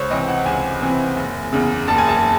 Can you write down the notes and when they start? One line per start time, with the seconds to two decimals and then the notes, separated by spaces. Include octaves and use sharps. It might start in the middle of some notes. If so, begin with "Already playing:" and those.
Already playing: C#2 C5 C#5
0.10 C3 E3 C4 D#5
0.28 F#5
0.46 C#2 G#5
0.82 C3 E3 C4
1.16 F#1
1.53 E2 C#3
1.88 F#1 A5
1.98 G#5
2.08 A5